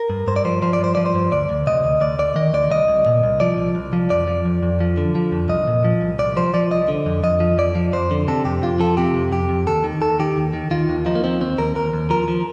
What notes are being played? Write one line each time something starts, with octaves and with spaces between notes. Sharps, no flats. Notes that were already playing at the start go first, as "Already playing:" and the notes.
Already playing: A#4
G2
G2 C5
D5
F3 C5
F3 C5
D5
G2 C5
F3 D5
C5
G2
D2 D5
D2
C3 D#5
D2
D2 D5
D2 D5
D#3 D#5
D2 D5
C2 D#5
C2
A#2
C2
F3 D5
C2
C2
F3
F2 D5
F3
F2
F2
F3
D3
F3
F2
C2 D#5
A#2
F3
C2
C2 D5
F3 C5
F3 D5
C2 D#5
D3
F2
F2 D#5
F3
F2 D5
F3
F2 C5
D3
C3 A4
F2 G4
F2 F4
F3 A4
C3 G4
F2
F2 G4
F2
D#2 A4
D#3
D#2 A4
D#3 G4
D#2
D#3
D#3 F4
D#2
F3 D#4
A#3
F3 C4
D#2 C4
D#2 A#4
D#2 A#4
D#2
F3 A#4
F3